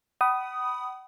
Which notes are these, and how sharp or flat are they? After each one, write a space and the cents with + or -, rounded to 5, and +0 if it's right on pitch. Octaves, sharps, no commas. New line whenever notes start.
F#5 +40 B5 +0 D#6 +0